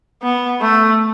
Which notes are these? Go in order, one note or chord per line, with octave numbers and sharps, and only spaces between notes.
B3
A3